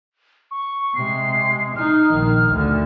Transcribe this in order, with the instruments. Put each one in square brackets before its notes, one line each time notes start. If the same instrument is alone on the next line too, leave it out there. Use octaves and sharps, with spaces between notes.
[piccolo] C#6
[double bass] C3 G#3 [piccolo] C7
[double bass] D#4 [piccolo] F6
[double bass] A#1 D#3
D2 D3